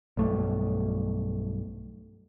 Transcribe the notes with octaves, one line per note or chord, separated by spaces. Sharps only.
B1 G2 A3